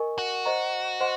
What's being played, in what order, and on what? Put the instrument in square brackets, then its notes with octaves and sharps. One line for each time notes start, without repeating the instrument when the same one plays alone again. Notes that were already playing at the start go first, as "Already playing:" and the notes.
Already playing: [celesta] A#4 D#5 G#5 C#6
[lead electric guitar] F#4
[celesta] C5 D#5 A#5 C#6
C5 D#5 F#5 C6